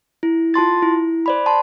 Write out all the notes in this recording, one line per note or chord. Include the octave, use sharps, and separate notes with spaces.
E4
F4 A5 C6 A6
E4
C5 D5 B5
A5 C6